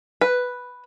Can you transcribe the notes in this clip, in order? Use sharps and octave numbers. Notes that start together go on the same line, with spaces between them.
B4